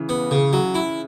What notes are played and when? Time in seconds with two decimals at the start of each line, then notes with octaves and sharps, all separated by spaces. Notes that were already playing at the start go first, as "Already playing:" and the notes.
Already playing: C#3 E3
0.09 B3
0.31 C#3
0.53 F#3
0.75 E4